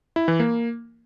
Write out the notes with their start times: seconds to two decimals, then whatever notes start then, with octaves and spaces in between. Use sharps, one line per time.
0.16 E4
0.28 E3
0.40 A#3